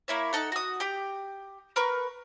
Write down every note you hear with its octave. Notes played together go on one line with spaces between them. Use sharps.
A#3 E4 C#5
D#4 A4 F#5
F#4 D#6
G4 G5
A#4 B4 C#6